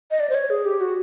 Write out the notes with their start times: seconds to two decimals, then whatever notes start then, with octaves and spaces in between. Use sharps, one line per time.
0.11 D#5
0.20 D5
0.29 C5
0.35 C#5
0.50 G#4
0.65 G4
0.80 F#4